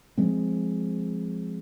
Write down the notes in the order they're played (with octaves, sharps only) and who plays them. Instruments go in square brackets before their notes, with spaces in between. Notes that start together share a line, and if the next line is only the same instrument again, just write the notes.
[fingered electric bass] F3 G#3 C4